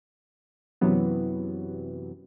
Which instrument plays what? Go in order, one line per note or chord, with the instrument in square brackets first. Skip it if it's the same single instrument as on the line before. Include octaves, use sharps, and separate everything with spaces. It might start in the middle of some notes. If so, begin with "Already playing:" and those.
[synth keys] F#2 C3 E3 F#3 B3